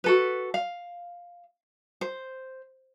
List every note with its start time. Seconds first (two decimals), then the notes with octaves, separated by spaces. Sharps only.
0.04 F#4 A4 B4
0.54 F5
2.01 C5